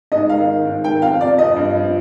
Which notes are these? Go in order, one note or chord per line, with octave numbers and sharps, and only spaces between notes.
G#2 D#5
D#3 F5
D#3
G#2
D#3 G5
F2 F5
C3 D5
F2 D#5
G2
F3